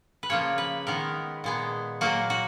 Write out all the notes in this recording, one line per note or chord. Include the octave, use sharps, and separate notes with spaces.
B4
C#3 F3 A#3 C#5
B4
D#3 G#3 B3 A#4
A#2 G#3 B3
A#2 F#3 A#3 F#4
F#4